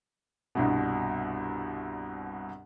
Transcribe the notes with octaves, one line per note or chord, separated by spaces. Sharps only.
C2 G2 B2